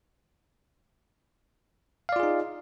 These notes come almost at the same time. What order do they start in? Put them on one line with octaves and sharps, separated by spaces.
F5 D5 F4 G#4 D#4